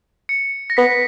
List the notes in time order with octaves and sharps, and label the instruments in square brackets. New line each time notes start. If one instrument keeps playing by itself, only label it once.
[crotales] C#7
A#6
[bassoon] B3 [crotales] B6